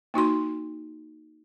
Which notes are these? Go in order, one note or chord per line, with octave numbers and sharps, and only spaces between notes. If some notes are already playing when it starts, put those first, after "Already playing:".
A#3 D#4 F#4 C6